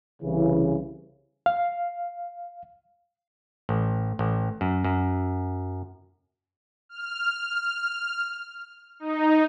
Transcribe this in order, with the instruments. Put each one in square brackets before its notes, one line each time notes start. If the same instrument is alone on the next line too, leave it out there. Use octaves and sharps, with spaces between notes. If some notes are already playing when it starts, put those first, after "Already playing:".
[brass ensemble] C2 C#3 E3
[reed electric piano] F5
[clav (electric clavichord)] A1
A1
F#2
F#2
[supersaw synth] F6
D#4